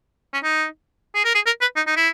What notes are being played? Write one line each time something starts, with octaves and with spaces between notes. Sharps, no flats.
C#4
D#4
G#4
A#4
G#4
A#4
B4
D#4
D#4
E4